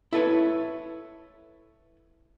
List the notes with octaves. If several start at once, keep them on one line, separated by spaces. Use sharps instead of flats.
E4 A4 B4 C#5